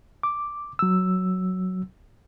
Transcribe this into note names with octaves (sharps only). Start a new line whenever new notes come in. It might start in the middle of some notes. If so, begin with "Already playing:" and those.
D6
F#3 E6